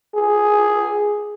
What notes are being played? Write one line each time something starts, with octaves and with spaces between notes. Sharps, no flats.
G#4